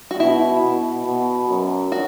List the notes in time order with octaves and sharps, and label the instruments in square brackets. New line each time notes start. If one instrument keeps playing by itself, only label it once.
[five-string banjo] F#4
[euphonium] B2 [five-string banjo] E4
[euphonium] B2
B2
F#2
[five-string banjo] F#4